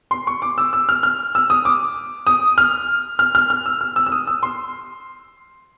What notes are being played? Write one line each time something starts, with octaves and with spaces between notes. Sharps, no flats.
C6
C#6
D6
E6
E6
F6
F6
E6
D#6
D6
D#6
F6
F6
F6
F6
E6
F6
E6
E6
D#6
E6
C6